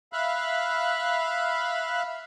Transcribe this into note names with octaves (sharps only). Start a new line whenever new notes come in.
E5 F5 B5 F#6